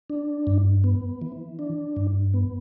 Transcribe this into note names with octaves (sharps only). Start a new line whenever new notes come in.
D4
G2
B3
E3
D4
G2
B3